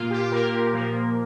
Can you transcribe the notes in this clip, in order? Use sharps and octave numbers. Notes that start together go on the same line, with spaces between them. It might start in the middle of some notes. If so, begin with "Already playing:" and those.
Already playing: A#2 A#3 F4
G4
G4
A#2 A#3 A#4
A#2 F3 A#3